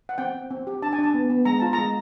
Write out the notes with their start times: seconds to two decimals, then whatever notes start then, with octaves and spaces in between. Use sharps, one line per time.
0.09 F#5
0.18 C4 G5
0.35 C4
0.50 C4
0.67 G4
0.82 D4 A5
0.93 G#5
0.98 D4
1.03 A5
1.14 B3
1.30 B3
1.45 G#3 A#5
1.60 F4 A5
1.73 G#3 A#5